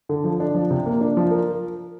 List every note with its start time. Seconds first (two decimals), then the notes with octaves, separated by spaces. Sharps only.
0.09 D3
0.24 F3
0.40 D4
0.54 F3
0.70 C3
0.86 A#3
1.01 D4
1.17 F3
1.31 A#4